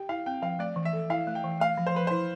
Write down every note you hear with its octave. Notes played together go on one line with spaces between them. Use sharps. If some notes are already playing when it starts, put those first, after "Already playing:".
Already playing: G4 G5
E4 F5
C4 G5
F3 F5
A3 D5
E3
E5
A4
E4 F5
A3
G5
E3
A3 F5
F3
C5
F3 B4
E4 C5